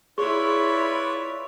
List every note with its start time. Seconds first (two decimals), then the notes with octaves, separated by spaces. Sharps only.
0.18 E4 F4 G#4 B4 C#5 D5 C6 C#6